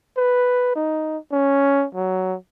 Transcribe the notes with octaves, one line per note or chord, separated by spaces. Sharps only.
B4
D#4
C#4
F#3